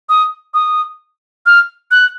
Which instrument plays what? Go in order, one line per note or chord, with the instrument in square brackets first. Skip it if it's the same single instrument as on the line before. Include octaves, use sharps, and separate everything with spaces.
[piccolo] D#6
D#6
F6
F#6